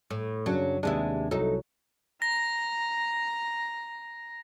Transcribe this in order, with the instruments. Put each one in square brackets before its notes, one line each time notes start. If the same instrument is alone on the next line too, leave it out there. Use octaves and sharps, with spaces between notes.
[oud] A2
[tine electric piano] F#2 C#3 D4 [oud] F#3
[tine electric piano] D#2 C3 D4 [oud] G#3 B3 E4
[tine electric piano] C2 F#3 [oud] D#4 A4
[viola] A#5 [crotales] A#6